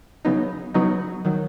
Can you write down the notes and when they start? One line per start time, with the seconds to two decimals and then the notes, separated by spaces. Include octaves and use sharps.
0.25 C#3 F#3 B3 D#4
0.74 C#3 F#3 B3 D#4
1.25 D#3 F#3